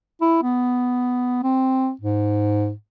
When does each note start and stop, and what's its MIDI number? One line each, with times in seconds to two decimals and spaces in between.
0.21 0.41 64
0.43 1.41 59
1.43 1.91 60
2.01 2.72 44